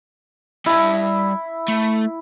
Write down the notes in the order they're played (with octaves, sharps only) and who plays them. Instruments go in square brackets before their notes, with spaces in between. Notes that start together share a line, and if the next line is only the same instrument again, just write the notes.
[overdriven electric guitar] G3 A5 [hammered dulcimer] E4
[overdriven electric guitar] A3